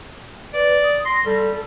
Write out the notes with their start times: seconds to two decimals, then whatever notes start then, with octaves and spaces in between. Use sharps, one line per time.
0.54 B4 D5
0.83 D#6
1.05 C6 A#6
1.26 G3 A4